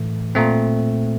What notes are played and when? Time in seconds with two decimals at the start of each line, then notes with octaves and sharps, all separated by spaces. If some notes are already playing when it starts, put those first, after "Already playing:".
Already playing: A2 E3 A3
0.35 A#2 A3 C4